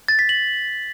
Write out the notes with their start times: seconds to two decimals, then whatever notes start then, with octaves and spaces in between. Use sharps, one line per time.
0.08 A6
0.19 B6
0.29 F#7